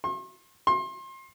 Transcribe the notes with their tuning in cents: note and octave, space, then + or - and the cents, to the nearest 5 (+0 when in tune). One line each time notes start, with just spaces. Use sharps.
C6 +45
C6 +30